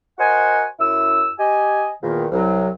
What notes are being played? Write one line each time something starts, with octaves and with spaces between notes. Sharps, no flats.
F#4 A#4 C5 D#5 F#5 G#5
F#2 E4 E6
G4 D#5 G#5
E2 A#2 D#3
C2 F#3